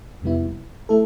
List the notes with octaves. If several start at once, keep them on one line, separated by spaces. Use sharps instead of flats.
F2 C3 G3 B3 E4
A3 E4 A4